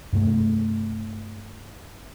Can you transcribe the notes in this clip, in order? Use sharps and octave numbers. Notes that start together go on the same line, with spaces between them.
G2 C3 A3